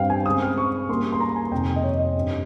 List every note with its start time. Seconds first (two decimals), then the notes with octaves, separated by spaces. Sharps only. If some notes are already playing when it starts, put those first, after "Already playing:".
Already playing: G2 G3 C4 F5 G5
0.10 G#5
0.26 C#3 G#3 C4 D#6
0.42 F6
0.58 C#6
0.89 C#3 G3 A#3 C6
1.13 C6
1.20 A#5
1.36 G#5
1.52 F2 C3 D#3 G5
1.76 D#5
1.84 C#5
1.99 D#5
2.15 G2 G3 C4